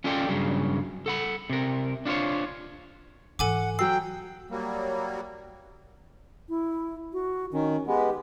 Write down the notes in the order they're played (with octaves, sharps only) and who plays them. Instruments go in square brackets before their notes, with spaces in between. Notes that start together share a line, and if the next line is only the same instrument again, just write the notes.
[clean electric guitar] C#4 F4 A4 D5 G5
G2 C#3 F#3
A4 F#5 B5
C3 A#4
D4 F4 G4 C5 C#5
[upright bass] G#2 E3 [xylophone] A4 G#5 D6 [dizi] F#5
[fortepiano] F#3 E6 [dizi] G5 [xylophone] C7
[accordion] F#3 G3 A#3
[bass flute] E4
F#4
[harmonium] D#3 [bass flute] C#4
[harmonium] G#3 B3 [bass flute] G4